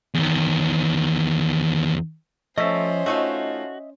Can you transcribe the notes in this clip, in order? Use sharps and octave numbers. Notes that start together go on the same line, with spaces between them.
E2 D#3
F3 A3 C#4 C5 D#5 E5
A3 D#4 F4 F#4